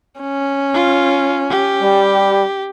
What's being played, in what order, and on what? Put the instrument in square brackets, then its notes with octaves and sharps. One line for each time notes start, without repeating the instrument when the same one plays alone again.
[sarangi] C#4
[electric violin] F4
G4
[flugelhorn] G3